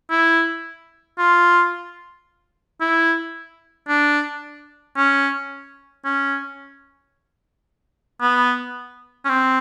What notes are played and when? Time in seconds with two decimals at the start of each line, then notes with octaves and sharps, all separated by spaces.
0.10 E4
1.19 F4
2.81 E4
3.88 D4
4.97 C#4
6.05 C#4
8.21 B3
9.25 C#4
9.29 C4